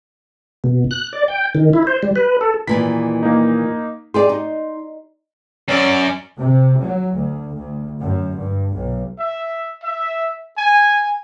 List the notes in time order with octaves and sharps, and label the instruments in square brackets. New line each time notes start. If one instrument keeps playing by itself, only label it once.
[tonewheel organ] B2
F#6
D5
G5
D#3
E4
C5
G3
B4
A4
[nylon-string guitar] D#2 A#2 E3 [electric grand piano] B6
[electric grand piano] A#3 D#4
[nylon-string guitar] G4 G#4 D5 [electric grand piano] C6
[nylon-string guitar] D#4
[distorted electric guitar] F#2 [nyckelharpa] C#4 D5
[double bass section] C3
F#3
D2
D2
F#2
G2
B1
[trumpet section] E5
E5
G#5